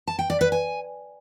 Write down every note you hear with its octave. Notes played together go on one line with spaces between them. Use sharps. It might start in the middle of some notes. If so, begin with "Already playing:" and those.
A5
G5
D5
B4
G#5